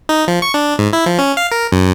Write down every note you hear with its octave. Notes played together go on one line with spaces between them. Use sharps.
D#4
F3
C#6
D4
G#2
E4
F3
C#4
F5
A#4
F#2